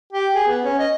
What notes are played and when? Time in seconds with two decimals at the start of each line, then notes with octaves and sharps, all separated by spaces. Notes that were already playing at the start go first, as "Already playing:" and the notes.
0.13 G4
0.35 G#4
0.48 B3
0.65 C#4
0.79 D#5